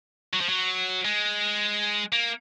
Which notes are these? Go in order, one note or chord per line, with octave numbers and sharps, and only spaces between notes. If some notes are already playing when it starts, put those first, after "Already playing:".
F#3
F3
F#3
G#3
A#3